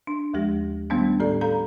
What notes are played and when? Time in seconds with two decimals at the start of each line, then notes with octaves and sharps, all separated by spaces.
0.07 D4
0.34 D#2 F3 G#3 G4 A#6
0.90 D#3 G3 A3 B3 C#4 D4
1.20 A2 G4 A4 D5
1.41 A4 F5 A#5 B5